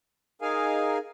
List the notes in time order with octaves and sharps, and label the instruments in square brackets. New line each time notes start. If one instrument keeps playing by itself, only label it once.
[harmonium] D#4 G#4 A#4 F5 G#5